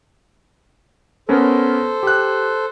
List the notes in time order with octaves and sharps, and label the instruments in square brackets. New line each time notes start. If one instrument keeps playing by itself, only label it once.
[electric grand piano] B3 C#4 A#4 [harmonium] A4 C5
[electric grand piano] G4 F#6